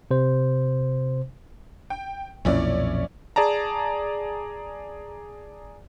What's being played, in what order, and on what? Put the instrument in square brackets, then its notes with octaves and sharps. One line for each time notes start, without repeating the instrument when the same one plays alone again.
[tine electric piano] C3 C5
[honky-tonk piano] G5
[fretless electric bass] B1 F2 A#2 [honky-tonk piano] C#4 E4 D5
[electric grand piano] G#4 D5 A5 A#5